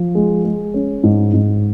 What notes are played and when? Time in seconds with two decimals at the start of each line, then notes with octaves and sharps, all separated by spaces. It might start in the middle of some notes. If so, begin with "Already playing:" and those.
Already playing: F3
0.15 G#3
0.44 G#3
0.74 C#4
1.03 G#2
1.34 G#2